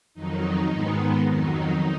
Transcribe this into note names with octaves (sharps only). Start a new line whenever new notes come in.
F2 D#3 F#3 D#4
G#2 D#3 G#3 B3
F2 D#3 F#3 D#4